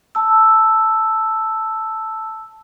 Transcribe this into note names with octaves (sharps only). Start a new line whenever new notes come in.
A5 E6